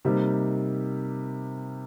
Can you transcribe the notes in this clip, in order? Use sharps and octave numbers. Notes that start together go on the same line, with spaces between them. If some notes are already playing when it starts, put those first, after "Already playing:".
C3 G3 A#3 D#4